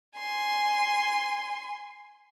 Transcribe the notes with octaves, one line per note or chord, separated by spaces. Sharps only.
G#5 C6